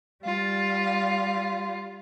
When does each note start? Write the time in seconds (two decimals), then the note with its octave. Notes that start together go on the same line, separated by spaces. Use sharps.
0.24 G3 F4